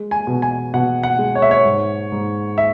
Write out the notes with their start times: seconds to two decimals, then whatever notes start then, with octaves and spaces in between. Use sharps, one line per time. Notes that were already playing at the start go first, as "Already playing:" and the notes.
Already playing: G#3
0.11 G#5
0.27 B2
0.42 G#5
0.74 B2 F#5
1.03 F#5
1.19 G#3
1.35 C#5
1.42 E5
1.51 C#5
1.65 G#2
2.12 G#2
2.58 E5